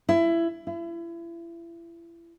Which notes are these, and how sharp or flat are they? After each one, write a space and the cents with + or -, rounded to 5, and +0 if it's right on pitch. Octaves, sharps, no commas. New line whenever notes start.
E4 +20
E4 +35